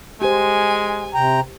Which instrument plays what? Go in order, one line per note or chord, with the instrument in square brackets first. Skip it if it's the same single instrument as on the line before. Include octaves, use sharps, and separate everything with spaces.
[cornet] G#3 [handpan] G4 C5 [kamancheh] G#5
[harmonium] C3 G5 A#5